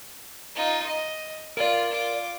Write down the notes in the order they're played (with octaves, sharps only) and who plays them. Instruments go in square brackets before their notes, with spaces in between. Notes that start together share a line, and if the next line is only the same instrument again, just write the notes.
[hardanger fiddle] D#4 F4
D#5
[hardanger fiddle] F4 [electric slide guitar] A#4 D5
[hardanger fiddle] F4 D6